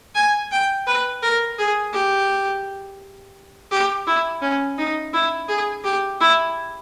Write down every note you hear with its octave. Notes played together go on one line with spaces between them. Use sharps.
G#5
G5
B4
A#4
G#4
G4
G4
E4
C#4
D#4
E4
G#4
G4
E4